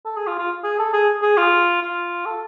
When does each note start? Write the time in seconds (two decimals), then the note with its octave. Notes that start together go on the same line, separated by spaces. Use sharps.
0.05 A4
0.17 G#4
0.27 F4
0.38 F4
0.64 G#4
0.79 A4
0.93 G#4
1.22 G#4
1.37 F4
1.81 F4
2.26 A4